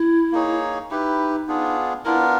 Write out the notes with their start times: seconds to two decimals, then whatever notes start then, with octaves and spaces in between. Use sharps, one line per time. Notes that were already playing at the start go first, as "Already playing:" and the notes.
Already playing: E4
0.32 A#3 D#4 G#4 C#5
0.90 D#4 E4 G4 B4
1.48 B3 D4 F4 G#4
2.05 B3 D4 E4 F4 A#4